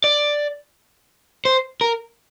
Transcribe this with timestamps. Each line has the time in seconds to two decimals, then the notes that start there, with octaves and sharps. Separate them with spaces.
0.04 D5
1.45 C5
1.81 A#4